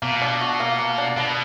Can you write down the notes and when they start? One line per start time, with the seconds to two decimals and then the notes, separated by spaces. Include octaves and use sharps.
0.02 B2 A#3
0.22 D4
0.41 F#4
0.60 A#3
0.79 A#3
0.98 D4
1.17 B2 B3